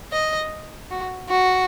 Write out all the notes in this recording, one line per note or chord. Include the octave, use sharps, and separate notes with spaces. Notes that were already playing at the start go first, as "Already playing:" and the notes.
D#5
F#4
F#4